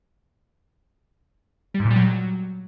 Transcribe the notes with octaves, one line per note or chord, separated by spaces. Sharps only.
G3
G#2
A#2
G3
F#3